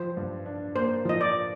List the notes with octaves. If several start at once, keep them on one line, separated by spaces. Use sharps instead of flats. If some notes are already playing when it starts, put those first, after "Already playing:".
Already playing: F3 C5
G2
D4
A#3 C5
F3 D#5
D5